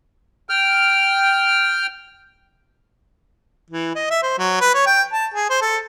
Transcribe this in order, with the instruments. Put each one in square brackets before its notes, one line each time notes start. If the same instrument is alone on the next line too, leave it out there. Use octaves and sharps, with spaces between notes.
[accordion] G5 F6
[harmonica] E3
D#5
E5
C5
F#3
B4
C#5
G5
A5
G#4
C5
A4